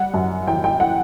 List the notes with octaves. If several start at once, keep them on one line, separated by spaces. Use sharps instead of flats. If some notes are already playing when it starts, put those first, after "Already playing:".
Already playing: G3 F#5
F#2
E3 G5
G5
F#5